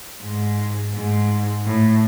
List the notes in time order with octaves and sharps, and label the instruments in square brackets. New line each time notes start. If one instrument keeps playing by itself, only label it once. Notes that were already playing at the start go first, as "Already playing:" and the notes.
[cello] G#2
G#2
A2